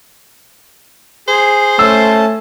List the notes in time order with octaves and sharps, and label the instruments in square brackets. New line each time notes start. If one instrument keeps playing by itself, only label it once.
[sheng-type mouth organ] G#4 [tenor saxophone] C5
[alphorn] A3 [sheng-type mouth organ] C#4 A5 [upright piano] E6